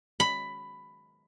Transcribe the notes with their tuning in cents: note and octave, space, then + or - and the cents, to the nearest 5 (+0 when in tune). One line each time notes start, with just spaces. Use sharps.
B5 +10